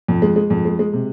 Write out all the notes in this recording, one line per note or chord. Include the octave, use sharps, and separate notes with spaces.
F2
G#3
G#3
F2
G#3
G#3
C3